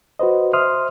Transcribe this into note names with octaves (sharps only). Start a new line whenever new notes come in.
F#4 B4 C5 D#5
C5 E5 C6 D#6 F6